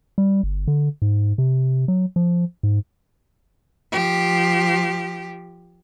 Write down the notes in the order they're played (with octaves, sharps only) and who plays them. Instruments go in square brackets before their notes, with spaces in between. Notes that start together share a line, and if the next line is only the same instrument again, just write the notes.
[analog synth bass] G3
G1
D3
G#2
C3
F#3
F3
G#2
[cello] F3 G4